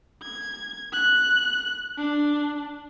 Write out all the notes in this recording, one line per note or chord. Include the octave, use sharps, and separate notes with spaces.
G#6
F#6
D4